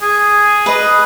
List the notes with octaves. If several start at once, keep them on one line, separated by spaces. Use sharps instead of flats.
G#4
B4 D#5